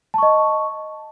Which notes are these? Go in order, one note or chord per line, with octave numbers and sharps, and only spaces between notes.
D#5 A5 C#6